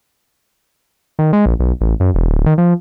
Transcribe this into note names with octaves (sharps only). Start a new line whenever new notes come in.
D#3
G#3
A#1
B1
A1
F#2
E1
D1
D#3
F3